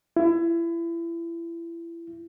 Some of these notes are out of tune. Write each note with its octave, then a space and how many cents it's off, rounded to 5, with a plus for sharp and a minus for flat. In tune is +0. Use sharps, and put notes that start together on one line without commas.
E4 +30